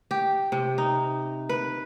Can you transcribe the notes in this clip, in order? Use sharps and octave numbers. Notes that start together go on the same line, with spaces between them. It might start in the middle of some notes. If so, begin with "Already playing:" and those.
G4
C3
D#4
B4